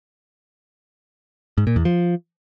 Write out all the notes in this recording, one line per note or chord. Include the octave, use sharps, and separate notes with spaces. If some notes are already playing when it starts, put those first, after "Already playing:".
G#2
A#2
E2
F3